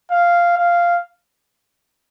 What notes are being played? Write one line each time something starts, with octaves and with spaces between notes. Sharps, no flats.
F5
F5